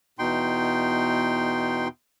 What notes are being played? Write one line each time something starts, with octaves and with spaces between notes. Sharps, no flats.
E2 B2 D#4 G5 C6